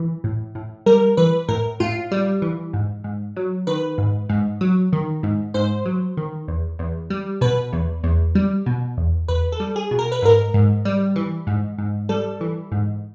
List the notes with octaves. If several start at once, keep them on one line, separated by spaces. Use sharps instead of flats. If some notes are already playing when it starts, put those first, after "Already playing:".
Already playing: E3
A2
A2
G3 A#4
E3 B4
A2 A#4
A2 F4
G3
E3
G#2
G#2
F#3
D#3 B4
G#2
G#2
F#3
D#3
G#2
G#2 C5
F#3
D#3
E2
E2
G3
B2 B4
E2
E2
G3
B2
E2
E2 B4
A4
G3
G#4
B2
A#4
B4
G#2 A#4
G#2
G3
E3
G#2
G#2
G3 A4
E3
G#2